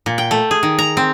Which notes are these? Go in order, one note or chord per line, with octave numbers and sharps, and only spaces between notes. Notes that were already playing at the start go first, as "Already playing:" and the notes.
A#2
G5
A3
G#4
D#3
A#5
C4